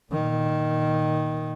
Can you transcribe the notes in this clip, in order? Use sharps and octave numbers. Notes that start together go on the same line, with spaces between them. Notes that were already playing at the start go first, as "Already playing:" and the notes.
A#2 D#3